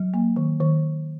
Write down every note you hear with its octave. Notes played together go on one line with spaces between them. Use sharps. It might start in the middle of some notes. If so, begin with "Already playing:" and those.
Already playing: F#3
A#3
D#3
D#3